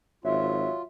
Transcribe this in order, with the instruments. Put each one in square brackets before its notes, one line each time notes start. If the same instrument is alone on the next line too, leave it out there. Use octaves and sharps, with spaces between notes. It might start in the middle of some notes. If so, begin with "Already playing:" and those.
[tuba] G#1 [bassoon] F#3 [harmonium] F4 [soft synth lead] E5